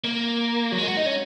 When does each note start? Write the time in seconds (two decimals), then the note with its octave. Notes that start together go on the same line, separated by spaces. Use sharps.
0.04 A#3
0.72 F#3
0.78 G#3
0.88 F#4
0.97 D#4
1.06 C#4